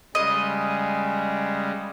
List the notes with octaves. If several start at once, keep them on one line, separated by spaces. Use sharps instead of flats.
C#3 G3 G#3 D#5